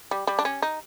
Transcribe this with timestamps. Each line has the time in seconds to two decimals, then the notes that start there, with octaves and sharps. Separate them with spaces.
0.11 G3
0.27 G3
0.39 D4
0.45 C#4
0.62 D#4